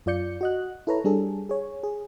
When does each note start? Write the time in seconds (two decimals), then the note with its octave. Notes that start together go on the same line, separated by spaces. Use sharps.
0.06 F#2 F4 D5 G6 C#7
0.41 F#4 D#5 F#6
0.87 E4 A4 B4 C#5 A#5
1.04 G3 D4 G#4 A4
1.49 G#4 C#5
1.83 G#4